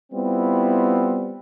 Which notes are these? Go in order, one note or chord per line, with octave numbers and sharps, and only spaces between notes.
G3 B3 C4 E4 F4